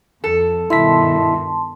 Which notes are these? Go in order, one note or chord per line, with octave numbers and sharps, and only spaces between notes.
F2 A4
G2 B2 D#3 E4 E5 A5 C6 B6